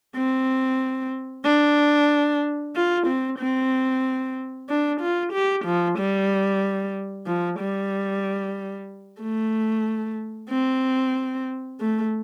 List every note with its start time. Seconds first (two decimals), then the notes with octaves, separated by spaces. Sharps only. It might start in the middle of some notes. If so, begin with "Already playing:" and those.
0.16 C4
1.45 D4
2.75 F4
3.07 C4
3.39 C4
4.69 D4
5.01 F4
5.33 G4
5.65 F3
5.98 G3
7.27 F3
7.60 G3
9.21 A3
10.50 C4
11.80 A3